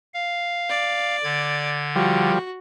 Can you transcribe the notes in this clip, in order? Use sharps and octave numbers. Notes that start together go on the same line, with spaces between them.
F5
D5
D3 G#6
F3 G3 F#4